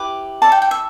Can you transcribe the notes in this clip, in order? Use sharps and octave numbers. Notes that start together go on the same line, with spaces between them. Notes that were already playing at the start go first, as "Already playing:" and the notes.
Already playing: E4 G4 B4 D6
E4 A4 D5 A5
G5
G5
E5